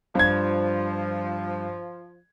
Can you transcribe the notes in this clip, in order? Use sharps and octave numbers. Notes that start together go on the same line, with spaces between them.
G2 F3 G#6